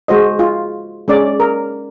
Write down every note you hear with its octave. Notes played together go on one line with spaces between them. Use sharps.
G#3 F#4 C5 D#5
F4
G#3 C#4 D5
A#4